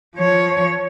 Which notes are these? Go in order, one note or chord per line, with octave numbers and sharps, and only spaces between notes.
F3 C#5